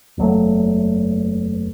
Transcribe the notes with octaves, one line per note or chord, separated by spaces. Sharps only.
F#1 E2 F#3 A3